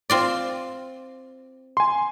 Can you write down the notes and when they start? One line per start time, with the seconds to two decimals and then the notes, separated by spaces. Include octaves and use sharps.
0.10 C4 F4 D5
1.77 G#5 C6